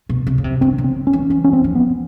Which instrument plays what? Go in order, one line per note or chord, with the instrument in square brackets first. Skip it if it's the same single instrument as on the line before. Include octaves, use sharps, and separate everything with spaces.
[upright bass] B2
C3
C#3
C3
[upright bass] D3 [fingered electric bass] C4
[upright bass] C#3
[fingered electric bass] C4
C#4
[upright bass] E3
[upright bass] E3 [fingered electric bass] C#4
[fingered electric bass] C#4
C4
[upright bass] F3
[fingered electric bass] B3